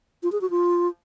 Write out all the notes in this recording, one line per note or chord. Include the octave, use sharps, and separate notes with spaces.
F4
G#4
F#4
F4